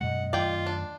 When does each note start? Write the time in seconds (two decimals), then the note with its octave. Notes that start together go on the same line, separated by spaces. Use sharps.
0.01 F#2 B2 G#3 D#5 F#5
0.33 F#2 D#3 A3 F4 D5 G5
0.66 D4